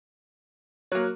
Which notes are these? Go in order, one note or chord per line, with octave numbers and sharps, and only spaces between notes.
F#3 A#3 C#5 F#6